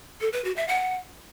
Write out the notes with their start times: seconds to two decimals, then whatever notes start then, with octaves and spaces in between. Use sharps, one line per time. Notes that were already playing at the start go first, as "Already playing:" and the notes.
0.21 A4
0.33 B4
0.45 F#4
0.56 E5
0.68 F#5